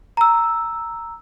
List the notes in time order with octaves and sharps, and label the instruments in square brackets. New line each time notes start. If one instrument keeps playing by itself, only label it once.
[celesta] A#5 E6